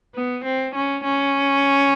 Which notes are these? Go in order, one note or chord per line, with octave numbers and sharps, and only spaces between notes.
B3
C4
C#4
C#4